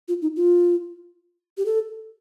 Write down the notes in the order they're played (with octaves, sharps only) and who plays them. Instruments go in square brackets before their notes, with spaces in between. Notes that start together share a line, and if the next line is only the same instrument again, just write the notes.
[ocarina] F4
D#4
F4
G4
A4